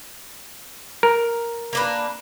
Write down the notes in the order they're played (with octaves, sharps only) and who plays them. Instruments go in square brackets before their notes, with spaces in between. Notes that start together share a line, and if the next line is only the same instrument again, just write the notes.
[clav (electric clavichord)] A#4
[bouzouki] A#3 D4 B4